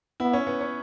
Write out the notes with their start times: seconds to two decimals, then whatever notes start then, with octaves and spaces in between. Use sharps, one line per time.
0.20 B3 E4
0.33 C#4
0.47 B3
0.61 C#4